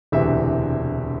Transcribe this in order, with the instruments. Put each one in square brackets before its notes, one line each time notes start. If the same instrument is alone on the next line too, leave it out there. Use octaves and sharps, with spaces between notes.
[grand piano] E1 D2 C3 E3 E5